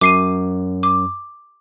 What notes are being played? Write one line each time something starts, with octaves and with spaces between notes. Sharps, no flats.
F#2 D6 C7 D#7
D6